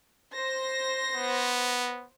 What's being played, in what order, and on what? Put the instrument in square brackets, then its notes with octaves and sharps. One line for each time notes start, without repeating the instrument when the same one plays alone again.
[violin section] C5 A#6
[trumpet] B3